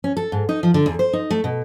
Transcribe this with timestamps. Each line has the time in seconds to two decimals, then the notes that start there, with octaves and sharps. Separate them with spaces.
0.04 C#4
0.17 A4
0.32 G#2
0.49 D#4
0.63 F3
0.74 D3
0.86 E2
0.99 C5
1.13 D#4
1.30 A3
1.44 B2